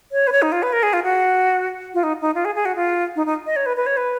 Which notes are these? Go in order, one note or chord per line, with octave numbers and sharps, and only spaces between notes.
C#5
B4
C#5
D#4
F4
B4
A#4
G#4
F4
F#4
F4
D#4
D#4
F4
G#4
G#4
F#4
F4
D#4
D#4
D#5
C#5
B4
B4
C#5
B4